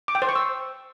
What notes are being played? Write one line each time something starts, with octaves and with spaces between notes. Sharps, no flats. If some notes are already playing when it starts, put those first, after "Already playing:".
D6
G5
C5
C#6
E6